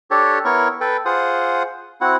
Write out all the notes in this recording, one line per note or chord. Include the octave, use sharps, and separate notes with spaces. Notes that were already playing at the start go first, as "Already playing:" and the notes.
D4 G4 A4 C#5
B3 E4 A#4 C#5 C#6
A4 B4 G5
F4 G#4 C5 F#5 D#6
C4 E4 F#4 F#5